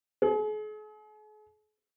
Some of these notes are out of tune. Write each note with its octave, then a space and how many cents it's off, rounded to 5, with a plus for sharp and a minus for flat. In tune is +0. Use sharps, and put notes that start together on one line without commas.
G#4 +45